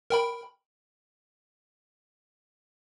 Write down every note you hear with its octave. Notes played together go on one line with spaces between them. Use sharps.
A#4 G5 B5